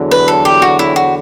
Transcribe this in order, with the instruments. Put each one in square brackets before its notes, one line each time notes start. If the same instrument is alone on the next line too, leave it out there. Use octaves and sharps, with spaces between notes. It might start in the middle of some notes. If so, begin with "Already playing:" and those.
Already playing: [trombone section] E2 D3 F#3
[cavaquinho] B4
A4
G4
F#4
E4
F#4